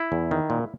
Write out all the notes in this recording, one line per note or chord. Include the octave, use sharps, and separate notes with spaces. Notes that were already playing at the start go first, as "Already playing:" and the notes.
Already playing: E4
E2
D#3
A#2